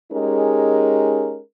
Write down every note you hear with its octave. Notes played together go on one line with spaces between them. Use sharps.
G#3 C#4 D#4 G4 G#4 A#4